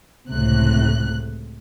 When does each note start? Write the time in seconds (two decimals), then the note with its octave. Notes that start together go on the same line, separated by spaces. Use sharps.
0.30 C#2 A2 C3 F#6